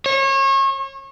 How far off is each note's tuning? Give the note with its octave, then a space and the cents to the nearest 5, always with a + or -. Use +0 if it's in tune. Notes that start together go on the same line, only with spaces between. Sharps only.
C#5 -35